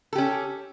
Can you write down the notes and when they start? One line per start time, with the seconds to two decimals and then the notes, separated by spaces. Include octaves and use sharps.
0.13 A4
0.15 G4
0.18 C#4